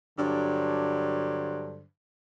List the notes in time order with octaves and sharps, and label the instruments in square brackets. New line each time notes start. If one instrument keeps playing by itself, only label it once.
[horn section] G2 D3 F#3 D4 C5